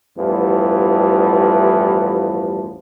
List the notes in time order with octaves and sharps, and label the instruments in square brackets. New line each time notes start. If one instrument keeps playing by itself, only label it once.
[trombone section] A1 E2 G2 F3